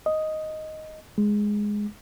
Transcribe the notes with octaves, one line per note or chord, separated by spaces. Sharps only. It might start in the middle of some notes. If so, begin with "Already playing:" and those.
D#5
G#3